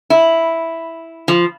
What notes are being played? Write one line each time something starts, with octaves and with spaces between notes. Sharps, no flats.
E4
F3